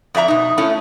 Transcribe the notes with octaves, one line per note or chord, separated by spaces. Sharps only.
F2 D5 E5 A#5
B2 D#4
A3 C#4 E4